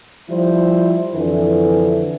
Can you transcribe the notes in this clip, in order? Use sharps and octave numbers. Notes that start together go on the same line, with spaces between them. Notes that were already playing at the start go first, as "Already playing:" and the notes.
F3 G3 E4 C5
F2 D3 E3